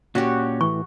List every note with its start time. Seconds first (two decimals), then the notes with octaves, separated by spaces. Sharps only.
0.15 A#2 C#4 F#4 G4
0.61 A2 E3 C#6